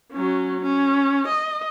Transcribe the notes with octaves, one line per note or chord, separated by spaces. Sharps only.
F#3 C#4
C#4
D#5